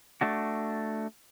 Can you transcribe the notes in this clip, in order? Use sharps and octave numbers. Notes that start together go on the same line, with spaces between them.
A3 D4 F#4